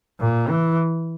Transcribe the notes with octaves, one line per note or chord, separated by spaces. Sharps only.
A#2
E3